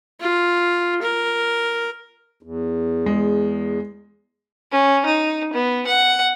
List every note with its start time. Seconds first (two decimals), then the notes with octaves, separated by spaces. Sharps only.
0.20 F4
1.02 A#4
2.43 E2
3.06 G#3
4.72 C#4
5.05 D#4
5.53 B3
5.87 F#5